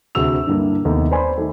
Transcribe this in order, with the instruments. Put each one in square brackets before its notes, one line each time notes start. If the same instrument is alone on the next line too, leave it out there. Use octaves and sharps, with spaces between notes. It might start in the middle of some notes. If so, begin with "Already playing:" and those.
[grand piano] D2 C3 F#4 G#4 E6 F7
G2 D3 G3 A#3 E4
D#2 C3 A3 B3 D#4
B4 C5 D5 G#5 B5 C6
D#3 A3